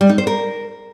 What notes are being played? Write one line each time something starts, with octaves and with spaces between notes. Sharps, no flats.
G3
D#4
C5
A#4